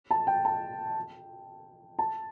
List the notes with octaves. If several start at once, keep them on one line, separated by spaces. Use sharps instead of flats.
A5
G5
A5
A5